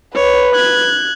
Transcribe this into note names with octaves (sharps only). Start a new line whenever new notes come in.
B4 C#5
F#6 G#6